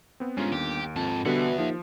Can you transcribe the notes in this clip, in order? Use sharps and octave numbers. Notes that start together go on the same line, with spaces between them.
B3 C4
G1 G#2 C#4 F4
D#2 G4
F2 G#2 A5
B2 D3 G3 B3 E5 F#5
D#2 F3